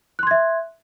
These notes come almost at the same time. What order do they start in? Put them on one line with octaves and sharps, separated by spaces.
F#6 C6 G#6 E5